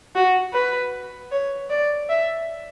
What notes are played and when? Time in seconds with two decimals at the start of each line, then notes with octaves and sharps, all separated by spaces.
0.15 F#4
0.53 B4
1.31 C#5
1.70 D5
2.09 E5